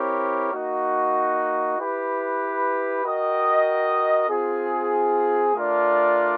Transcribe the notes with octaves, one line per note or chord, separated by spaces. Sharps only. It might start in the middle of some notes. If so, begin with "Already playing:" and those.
Already playing: C4 E4 G4 A#4 C#5
A#3 D#4 F#4
E4 G4 B4
F#4 A#4 D#5 G5
C4 F4 G#4
A3 D4 F4 A#4 D5